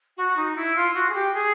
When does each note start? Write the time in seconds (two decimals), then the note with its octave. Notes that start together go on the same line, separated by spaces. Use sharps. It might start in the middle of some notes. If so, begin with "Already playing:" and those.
0.17 F#4
0.36 D#4
0.56 E4
0.76 F4
0.94 F#4
1.09 G#4
1.14 G4
1.34 G#4